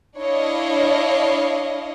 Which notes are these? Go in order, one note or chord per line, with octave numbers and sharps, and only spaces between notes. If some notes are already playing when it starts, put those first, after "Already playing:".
D4 E4 C#5 D#5 F5